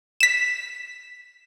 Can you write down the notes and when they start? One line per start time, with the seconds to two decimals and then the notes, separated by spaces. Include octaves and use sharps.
0.20 B6 E7